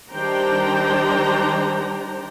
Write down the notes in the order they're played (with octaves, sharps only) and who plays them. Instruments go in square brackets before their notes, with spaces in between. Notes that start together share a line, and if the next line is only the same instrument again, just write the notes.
[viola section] D#3 G3 D4 C5 G5 A#5